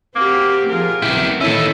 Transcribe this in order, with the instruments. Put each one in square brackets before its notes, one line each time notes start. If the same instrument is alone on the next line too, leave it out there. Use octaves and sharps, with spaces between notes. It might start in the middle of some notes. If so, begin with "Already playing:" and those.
[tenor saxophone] A#3 [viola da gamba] C4 F#4 G4
[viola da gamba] F3 F4 G#4 [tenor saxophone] A#4
[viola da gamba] F#3 B3 [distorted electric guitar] E4 G4
[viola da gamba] D#3 A#3 E4 [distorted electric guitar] C#4 A4 [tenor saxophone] E5